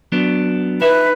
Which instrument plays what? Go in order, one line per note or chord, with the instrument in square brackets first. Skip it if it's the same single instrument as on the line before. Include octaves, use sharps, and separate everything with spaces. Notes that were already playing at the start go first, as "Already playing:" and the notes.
[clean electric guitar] F#3 B3 D4
[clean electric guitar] D#4 E5 [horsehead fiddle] B4